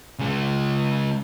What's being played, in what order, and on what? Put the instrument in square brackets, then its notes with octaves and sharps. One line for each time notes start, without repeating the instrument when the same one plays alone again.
[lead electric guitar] C#3 G#3